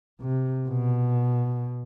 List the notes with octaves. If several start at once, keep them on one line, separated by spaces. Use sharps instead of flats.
C3
B2